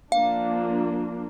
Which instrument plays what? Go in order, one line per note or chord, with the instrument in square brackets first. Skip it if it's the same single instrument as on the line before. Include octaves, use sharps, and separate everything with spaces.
[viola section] F3 A#3 D4 [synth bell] F5